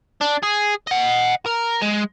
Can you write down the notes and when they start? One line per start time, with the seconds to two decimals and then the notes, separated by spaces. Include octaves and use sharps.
0.21 D4
0.43 G#4
0.87 D#5 F#5
1.46 A#4
1.82 G#3